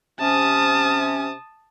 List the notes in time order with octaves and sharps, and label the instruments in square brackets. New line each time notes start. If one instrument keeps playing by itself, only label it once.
[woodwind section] C3 C#4 [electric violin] A5 D#6